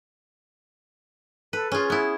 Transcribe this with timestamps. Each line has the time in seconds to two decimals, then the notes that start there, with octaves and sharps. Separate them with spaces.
1.53 A4 B4
1.72 C#4 F4 G#4
1.90 B3 E4